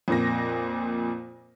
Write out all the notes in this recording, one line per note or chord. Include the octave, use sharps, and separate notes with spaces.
F2 A#2 A#6